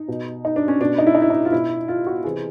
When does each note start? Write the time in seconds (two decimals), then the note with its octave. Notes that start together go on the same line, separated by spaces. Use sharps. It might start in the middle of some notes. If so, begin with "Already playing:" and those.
Already playing: D#4
0.08 B2
0.45 D#4
0.56 D4
0.68 C#4
0.80 B2 D4
0.98 D#4
1.07 E4
1.15 D#4
1.22 E4
1.30 D#4
1.45 F4
1.52 B2 E4
1.88 F4
2.07 F#4
2.24 C3 E3 G#4